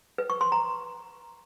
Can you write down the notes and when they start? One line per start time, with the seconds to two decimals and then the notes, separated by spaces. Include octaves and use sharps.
0.18 B4
0.30 C#6
0.41 C6
0.52 A#5